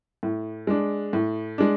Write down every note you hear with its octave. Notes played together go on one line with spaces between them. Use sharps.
A2
G#3 D4
A2
G#3 D4